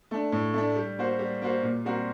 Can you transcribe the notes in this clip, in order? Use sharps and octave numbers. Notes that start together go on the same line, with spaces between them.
A3 D4
A2
A3 D4
G3
A#3 F#4 C5
G3
A#3 F#4 C5
A#2
G3 C4 F#4 A#4